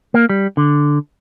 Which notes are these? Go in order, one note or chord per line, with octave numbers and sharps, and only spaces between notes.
A#3
G3
D3